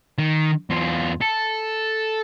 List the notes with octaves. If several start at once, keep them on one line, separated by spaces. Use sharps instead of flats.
D#3
E2 F4
A4